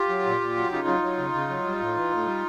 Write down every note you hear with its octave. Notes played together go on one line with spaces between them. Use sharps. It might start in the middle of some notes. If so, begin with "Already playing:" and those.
Already playing: F4 G4
F#3
A#2
A#2
F#3
C#3 D#4 F4
F#3
F#3
C#3
C#3
F#3
G3
A2
E3
A2
G3